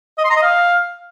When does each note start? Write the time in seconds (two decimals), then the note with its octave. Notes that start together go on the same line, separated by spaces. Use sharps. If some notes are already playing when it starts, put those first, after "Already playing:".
0.18 D#5
0.24 C6
0.30 A#5
0.36 D#5
0.43 F5